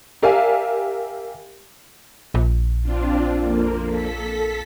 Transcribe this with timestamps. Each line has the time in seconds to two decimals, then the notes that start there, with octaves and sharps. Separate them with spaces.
0.23 G4 A#4 D5 E5 F5 G#5
2.34 A#1
2.82 C4 D4 F4
3.36 F2 A#3
3.89 A4 B6